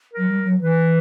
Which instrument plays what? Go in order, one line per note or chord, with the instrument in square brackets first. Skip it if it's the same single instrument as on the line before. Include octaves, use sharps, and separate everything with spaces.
[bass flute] F#3 [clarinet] A#4
[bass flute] G3
F#3
[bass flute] E3 [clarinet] B4